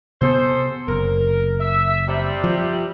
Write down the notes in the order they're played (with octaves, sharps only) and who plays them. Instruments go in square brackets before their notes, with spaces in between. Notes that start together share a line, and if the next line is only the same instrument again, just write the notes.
[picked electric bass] C3 B3 [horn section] G#4 A4 C5
[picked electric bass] F#1 [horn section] A#4
[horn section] E5
C3 G3
[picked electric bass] F3